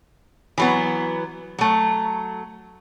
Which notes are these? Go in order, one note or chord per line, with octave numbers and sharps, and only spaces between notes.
E3 F#3 B3
F#3 A3